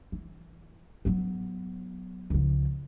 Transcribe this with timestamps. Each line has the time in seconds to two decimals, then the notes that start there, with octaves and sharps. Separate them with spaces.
0.12 E3
1.05 F#3 B3
2.30 C#2 F3